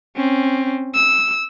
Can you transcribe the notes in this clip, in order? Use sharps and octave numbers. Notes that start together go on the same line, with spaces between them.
C4 C#4
E6